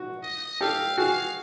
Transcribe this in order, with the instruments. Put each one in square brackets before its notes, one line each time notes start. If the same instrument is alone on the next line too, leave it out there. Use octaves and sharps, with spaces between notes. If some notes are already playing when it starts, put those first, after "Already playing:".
Already playing: [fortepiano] F#4
[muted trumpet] D#5
[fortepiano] G4 A4 [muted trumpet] F5
[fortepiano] F#4 G#4 [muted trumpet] F5